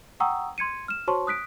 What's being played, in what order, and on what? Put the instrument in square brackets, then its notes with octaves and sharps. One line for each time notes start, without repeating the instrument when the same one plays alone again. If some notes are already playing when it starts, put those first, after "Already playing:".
[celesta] F#5 G5 A#5 C#6 D#6 E6
C6 G#6 C#7 D#7
F6 E7
F#4 C5 C#5 A5 C6 C#6
D#6 F#6 B6 D7